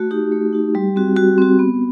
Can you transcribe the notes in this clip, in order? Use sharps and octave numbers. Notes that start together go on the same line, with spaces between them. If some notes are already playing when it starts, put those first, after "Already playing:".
Already playing: A3 F#4
D#4 F#4 G4
A3
D#4 F#4
G3
C4 F#4
G3 F#4
C4 F#4
B3